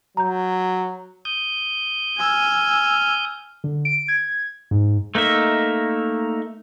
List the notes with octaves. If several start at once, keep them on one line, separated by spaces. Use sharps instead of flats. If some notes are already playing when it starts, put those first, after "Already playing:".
F#3 A#5 G6
D#6 G6
G#5 E6 F6
D3
D7
G#6
G#2
A3 A#3 D#4 E5